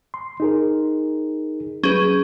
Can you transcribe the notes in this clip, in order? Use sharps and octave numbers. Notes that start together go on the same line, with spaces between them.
C6
D#4 G#4 A#4
F#3 C#4 G#4 B4